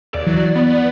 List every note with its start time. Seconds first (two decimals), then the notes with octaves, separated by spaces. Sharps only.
0.15 D#2 D5
0.26 E3 F#3
0.56 B3